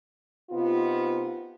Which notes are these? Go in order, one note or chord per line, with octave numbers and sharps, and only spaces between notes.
C3 B3 D#4 F4